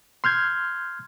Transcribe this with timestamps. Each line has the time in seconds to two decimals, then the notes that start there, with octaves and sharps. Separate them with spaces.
0.24 C6 F6 G6 G#6